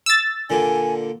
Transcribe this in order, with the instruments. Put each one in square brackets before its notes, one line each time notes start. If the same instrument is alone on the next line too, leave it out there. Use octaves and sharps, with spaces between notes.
[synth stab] E6 A6
[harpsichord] A#2 D3 [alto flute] G#5